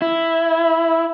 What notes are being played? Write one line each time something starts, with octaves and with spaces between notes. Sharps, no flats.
E4